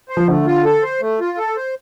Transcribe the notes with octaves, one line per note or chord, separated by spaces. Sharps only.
C5
F3
D3 A3
F4
A4
C5
A3
F4
A4
C5